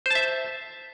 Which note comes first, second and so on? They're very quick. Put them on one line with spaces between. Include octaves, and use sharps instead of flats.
C5 A5 E5